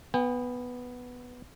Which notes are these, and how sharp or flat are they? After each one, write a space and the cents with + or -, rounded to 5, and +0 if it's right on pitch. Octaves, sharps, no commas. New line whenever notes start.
B3 +0 G5 +45